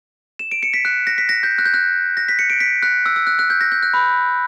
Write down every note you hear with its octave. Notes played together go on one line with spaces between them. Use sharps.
E7
D7
C#7
B6
F#6
A#6
B6
A#6
G6
F#6
G6
F#6
A#6
B6
C#7
D7
B6
F#6
E6
E6
F#6
F#6
G6
A#6
G6
F#6
B5